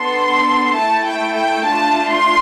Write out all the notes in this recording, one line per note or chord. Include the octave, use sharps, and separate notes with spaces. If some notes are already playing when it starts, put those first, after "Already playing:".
Already playing: B3 D4 A4 C6
A3 E4 A4 A5
G5
G5
A3 D4 F4 A5
C6